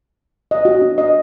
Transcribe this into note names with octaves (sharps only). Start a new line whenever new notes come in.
D#5
F#4
D4
D#5